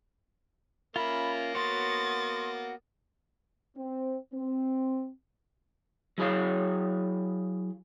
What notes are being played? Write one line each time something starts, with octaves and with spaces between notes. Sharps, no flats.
A#3 C#4 F4 E5 B5
B3 F#4 C#5 C6 D#6 A6
C4
C4
F#3 E4 G#4 C#5 F5